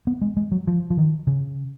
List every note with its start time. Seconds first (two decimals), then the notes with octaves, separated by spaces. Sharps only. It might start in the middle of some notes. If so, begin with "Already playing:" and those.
0.07 B3
0.22 G#3
0.37 G#3
0.52 F#3
0.67 F3
0.90 F3
0.97 D#3
1.27 C#3